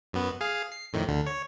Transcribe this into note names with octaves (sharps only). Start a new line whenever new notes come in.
F#2 B3
G#4 F5
C7
F2 A2 D#3
D2 D3
C#5